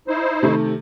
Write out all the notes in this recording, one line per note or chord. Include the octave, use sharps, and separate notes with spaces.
D#4 E4 C5
C3 D#3 A3